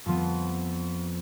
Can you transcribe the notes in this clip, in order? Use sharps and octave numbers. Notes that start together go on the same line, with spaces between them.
F2 F3 B3